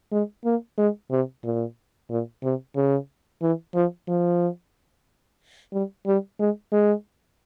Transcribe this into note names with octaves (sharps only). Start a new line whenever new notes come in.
G#3
A#3
G#3
C3
A#2
A#2
C3
C#3
E3
F3
F3
G3
G3
G#3
G#3